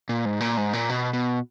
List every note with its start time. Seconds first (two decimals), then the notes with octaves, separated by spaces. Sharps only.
0.09 A#2
0.25 G#2
0.40 A#2
0.57 G#2
0.73 A#2
0.89 B2
1.13 B2